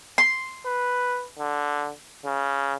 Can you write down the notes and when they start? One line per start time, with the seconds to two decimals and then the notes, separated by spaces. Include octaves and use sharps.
0.18 C6
0.66 B4
1.39 D3
2.25 C#3